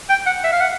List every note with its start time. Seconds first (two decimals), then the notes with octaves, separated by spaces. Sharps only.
0.10 G5
0.26 F#5
0.44 E5
0.52 F5
0.61 F#5